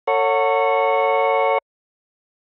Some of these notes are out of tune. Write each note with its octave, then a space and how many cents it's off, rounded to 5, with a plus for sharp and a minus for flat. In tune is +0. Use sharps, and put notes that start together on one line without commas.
A4 +40 C#5 +0 F#5 -15